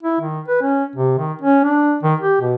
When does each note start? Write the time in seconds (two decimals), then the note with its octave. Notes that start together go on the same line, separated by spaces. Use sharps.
0.03 E4
0.20 D#3
0.48 B4
0.62 C#4
0.96 C3
1.18 D#3
1.42 C#4
1.64 D4
2.03 D#3
2.21 G4
2.41 B2